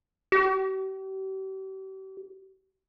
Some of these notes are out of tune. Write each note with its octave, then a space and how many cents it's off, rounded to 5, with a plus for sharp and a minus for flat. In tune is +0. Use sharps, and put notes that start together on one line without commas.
G4 -40